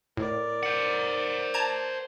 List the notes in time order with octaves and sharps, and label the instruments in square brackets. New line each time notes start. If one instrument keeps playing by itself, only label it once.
[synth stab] A2 [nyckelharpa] A#4 D5
[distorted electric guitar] C5 F#5
[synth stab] A5 A#5 G#6